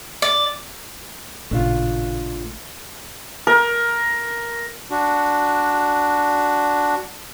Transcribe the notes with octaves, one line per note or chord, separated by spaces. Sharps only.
D5
A1 A#2 C#3 A3 D4 F4
A#4
D4 F#4